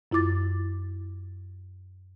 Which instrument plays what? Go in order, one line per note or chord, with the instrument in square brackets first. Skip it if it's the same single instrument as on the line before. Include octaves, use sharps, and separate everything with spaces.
[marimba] F#2 E4 F4 D6 A6